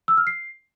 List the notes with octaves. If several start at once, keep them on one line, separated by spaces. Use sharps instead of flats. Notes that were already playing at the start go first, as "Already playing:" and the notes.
E6
F6
C7